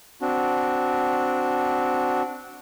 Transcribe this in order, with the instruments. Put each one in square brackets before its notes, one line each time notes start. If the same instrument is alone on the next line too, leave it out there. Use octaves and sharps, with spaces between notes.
[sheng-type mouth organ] C4 D4 F#4